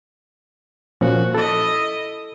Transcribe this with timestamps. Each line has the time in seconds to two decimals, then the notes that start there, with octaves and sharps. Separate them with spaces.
1.01 A#2 F3 C#4 F#4
1.34 E4 A4 D#5